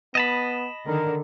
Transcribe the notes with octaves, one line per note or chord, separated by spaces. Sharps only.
B3 D#5 A5 B5
D3 D#3 A#4